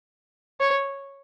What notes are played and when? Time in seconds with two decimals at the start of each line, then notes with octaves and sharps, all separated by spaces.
0.60 C#5